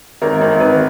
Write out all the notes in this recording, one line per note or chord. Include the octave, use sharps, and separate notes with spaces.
G#1 A#4
G#1
G#1 B4